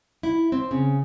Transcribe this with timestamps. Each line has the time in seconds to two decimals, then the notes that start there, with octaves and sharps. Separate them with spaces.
0.23 E4
0.52 C4
0.71 C#3